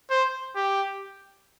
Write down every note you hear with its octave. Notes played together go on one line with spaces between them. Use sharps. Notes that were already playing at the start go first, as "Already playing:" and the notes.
C5
G4